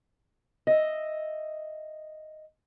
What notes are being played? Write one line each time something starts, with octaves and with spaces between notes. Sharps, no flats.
D#5 E5